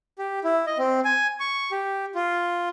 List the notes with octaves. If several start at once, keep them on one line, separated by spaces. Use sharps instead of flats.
G4
E4
D#5
C4
G#5
C#6
G4
F4